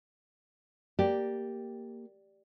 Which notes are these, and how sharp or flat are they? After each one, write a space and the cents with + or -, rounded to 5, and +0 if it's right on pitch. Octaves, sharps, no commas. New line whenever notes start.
A#3 +0 G4 +0 D5 +0